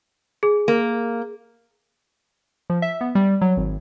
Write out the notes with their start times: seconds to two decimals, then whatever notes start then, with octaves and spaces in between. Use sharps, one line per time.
0.43 G#4
0.68 A#3
2.70 F3
2.82 E5
3.01 B3
3.15 G3
3.41 F#3
3.57 G#1